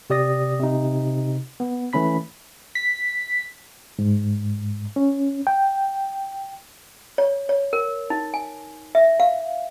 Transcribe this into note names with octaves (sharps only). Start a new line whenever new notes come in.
C3 G4 D5 D#6 A#6
C3 D#4
B3
E3 A3 C#4 B5 B6
B6
G#2
C#4
G5
C#5
C#5
A#4
D#4
G#5
E5
F5